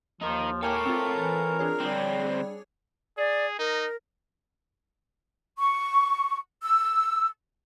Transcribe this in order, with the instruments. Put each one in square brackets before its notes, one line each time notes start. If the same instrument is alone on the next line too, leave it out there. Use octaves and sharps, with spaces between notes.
[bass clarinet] D#2 [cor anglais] F3 [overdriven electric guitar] D#4 A#4
[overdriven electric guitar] A4 C#5 [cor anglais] A#4 [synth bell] G5 G#5 D6
[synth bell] C4 F4
[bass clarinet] E3
[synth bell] D4 G#4 C#5
[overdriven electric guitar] D3 C4 [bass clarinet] G3
[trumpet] G#4 [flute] D5
[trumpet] D#4 [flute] A#4
[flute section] C#6
E6